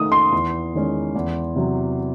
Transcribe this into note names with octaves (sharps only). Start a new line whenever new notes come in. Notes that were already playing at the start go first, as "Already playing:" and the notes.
Already playing: D#3 A3 D#4 D#6
C6
E2
D#3 G#3 C#4
E2
C3 F#3